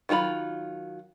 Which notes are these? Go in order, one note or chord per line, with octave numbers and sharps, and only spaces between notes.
D#3 F#3 F4 A#5 B5